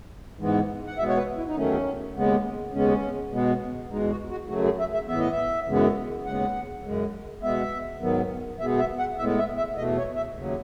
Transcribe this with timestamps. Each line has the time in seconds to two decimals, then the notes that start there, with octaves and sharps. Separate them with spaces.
0.39 G#2 E3 G#3 B3
0.87 F#5
0.98 B2 G#3 B3 E5
1.08 C#5
1.17 B4
1.37 E4
1.47 D#4
1.56 E2 D#3 F#3 A3 C#4
2.16 D#2 C#3 G#3 B3
2.74 D#2 C#3 G#3 B3 C#4
3.32 B2 G#3 B3
3.91 E2 B2 G#3 D#4
4.10 F#4
4.30 F#4
4.49 F#2 C#3 F#3 A3 F#4
4.65 G#4
4.79 E5
4.94 E5
5.08 A2 E3 B3 E5
5.20 D#5
5.31 E5
5.67 F#2 C#3 E3 G#3 B3
6.25 D#2 C#3 G#3 B3 F#5
6.84 F#2 C#3 G#3
7.42 B2 G#3 B3 E5
8.01 G#2 D#3 F#3 B3
8.60 B2 G#3 B3 E5
8.79 E5
8.99 F#5
9.18 A2 G#3 B3 E5
9.38 E5
9.57 E5
9.77 E2 B2 A3 D#5
9.97 C#5
10.16 E5
10.36 D#2 C#3 F#3